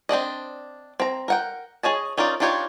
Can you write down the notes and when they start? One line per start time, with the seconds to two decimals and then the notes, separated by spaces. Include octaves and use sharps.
0.09 C4 D4 D5 D#5
1.00 C4 A#5
1.28 A#4 F#5 G5
1.83 G#4 C#5 D#5 A5
2.18 C#4 D#4 F4 A#4 D5
2.40 D4 D#4 F4 G4 C#5